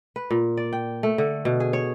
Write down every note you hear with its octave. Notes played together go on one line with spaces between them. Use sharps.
B4
A#2
D5
G5
A3
D3
B2
G#4
C#5